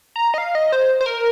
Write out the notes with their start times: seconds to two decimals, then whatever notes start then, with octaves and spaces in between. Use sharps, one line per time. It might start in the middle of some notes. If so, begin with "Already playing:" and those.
0.16 A#5
0.34 D#5
0.38 F5
0.55 D#5
0.72 C5
1.01 C5
1.06 A#4